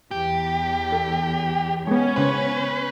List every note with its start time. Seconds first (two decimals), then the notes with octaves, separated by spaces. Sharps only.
0.11 E2 G4
0.92 A4
1.87 G#3 B3 C#4 C#5
2.16 C#3 B3 B4 C5